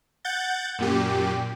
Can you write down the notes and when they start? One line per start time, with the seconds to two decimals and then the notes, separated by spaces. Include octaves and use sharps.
0.25 F#5 G6 A6
0.79 F#2 A#2 G4